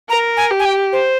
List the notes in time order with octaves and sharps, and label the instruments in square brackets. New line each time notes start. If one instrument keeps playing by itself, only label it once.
[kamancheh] A#4 [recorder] A#5
[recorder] G#5
[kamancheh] G4
[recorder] G#5
G5
C5